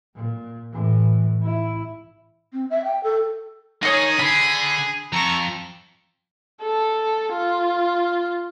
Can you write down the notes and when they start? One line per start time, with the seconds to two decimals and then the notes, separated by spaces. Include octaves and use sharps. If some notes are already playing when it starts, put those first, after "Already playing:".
0.16 A#2
0.73 A2 E3
1.43 E4
2.53 C4
2.70 E5
2.85 G5
3.04 A4
3.83 D#3 D#4 G#4 C#5 D#5
4.19 D3 B5
5.13 F2 A4 A#5 C#6
6.62 A4
7.33 F4